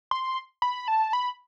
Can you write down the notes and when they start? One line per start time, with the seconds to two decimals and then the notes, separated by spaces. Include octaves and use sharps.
0.11 C6
0.62 B5
0.88 A5
1.13 B5